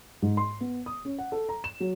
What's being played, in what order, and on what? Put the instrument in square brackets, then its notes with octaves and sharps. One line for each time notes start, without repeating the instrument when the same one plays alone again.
[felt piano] G#2
C6
B3
D#6
C#4
F#5
A4
A#5
E7
F#3